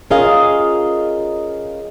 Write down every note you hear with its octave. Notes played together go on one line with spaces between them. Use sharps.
C#4 F4 G#4 A#4 D#5 F5